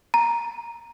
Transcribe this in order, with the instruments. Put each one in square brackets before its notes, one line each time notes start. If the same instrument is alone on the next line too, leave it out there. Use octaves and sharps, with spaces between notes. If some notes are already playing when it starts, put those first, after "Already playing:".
[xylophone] A#5